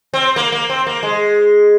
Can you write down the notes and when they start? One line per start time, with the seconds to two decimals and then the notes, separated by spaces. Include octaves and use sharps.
0.14 C4
0.36 A#3
0.53 A#3
0.69 C4
0.87 A#3
1.03 G#3